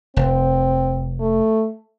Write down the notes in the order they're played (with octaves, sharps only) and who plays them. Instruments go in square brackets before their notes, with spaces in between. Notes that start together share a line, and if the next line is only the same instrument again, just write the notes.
[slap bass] F1 [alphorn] C4
[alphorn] A3